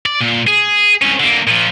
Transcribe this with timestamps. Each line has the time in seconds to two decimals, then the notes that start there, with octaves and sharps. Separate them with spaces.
0.06 D5
0.21 A#2
0.47 G#4
1.01 C2 C#4
1.20 D3 A#3
1.47 A#2 F3